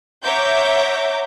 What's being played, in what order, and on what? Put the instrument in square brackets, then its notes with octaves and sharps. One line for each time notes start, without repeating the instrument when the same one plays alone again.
[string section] C#5 E5 F#5 A#5 D6 G6